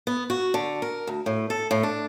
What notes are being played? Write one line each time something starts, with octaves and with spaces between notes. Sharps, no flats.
B3
F#4
D3
A#4
D2
A2
A4
A2
D4